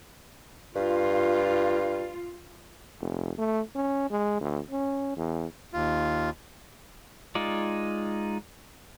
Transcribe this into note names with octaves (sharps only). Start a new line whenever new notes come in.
G2 F4
F1
A3
C#4
G#3
D2
C#4
E2
D#2 F4
G#3 D#4 F4 D5